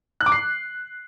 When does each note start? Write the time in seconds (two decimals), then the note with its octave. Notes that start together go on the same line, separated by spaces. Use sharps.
0.21 F#6
0.26 D6
0.32 C7